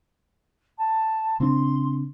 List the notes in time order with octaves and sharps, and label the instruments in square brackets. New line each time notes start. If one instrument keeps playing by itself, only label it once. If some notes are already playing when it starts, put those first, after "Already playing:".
[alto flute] A5
[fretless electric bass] C#3 C4 D4 [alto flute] C6